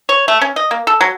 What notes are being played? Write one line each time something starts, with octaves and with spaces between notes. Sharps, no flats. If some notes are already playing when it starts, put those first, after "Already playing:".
C#5
A3
C#4
D#5
A#3
A4
F#3